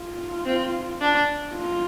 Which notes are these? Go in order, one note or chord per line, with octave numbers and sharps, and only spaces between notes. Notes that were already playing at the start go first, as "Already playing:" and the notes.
Already playing: F4
C4
D4
F4